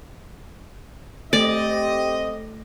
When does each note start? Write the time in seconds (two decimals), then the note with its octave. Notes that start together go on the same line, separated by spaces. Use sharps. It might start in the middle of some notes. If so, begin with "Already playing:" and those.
1.33 A3 C4 G4 A4 D5 D#5 A#6